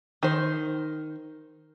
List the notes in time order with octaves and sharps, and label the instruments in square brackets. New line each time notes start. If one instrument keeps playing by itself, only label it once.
[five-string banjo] D#3 C5